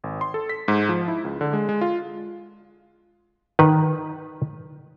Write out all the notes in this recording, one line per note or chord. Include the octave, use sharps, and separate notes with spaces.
G#1
C6
A4
B6
G#2
F3
E4
C#2
D3
G#3
G#3
F4
D#3 B4